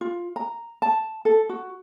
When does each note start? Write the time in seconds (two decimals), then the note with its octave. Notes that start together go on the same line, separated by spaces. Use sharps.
0.01 F4
0.36 A#5
0.82 A5
1.25 A4
1.49 F#4